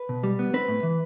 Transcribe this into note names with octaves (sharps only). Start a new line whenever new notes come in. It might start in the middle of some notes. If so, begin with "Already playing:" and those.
Already playing: B4
B2
G3
B3
C4 B4
A2
E3